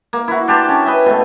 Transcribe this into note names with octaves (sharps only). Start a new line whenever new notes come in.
A#3
E4 F#4
D4 G4 A5 C6
C#4
B4 D#5 E5
B2 A3